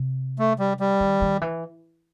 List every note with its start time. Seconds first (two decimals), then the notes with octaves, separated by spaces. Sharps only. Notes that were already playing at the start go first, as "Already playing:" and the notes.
Already playing: C3
0.39 A3
0.59 G3
0.80 G3
1.00 D#3
1.22 D#3
1.41 E3